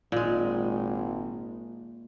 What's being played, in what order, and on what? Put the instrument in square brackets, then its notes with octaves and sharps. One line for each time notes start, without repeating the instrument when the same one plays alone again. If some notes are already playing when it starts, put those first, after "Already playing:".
[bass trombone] G#1 [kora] A#2 G#3